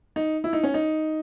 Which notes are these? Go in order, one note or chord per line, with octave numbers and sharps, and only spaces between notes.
D#4
E4
D#4
C#4
D#4